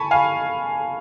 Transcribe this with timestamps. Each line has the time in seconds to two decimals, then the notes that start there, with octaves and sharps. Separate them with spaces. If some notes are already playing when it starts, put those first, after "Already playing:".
Already playing: G#5 A5 B5 C#6
0.11 F5 G#5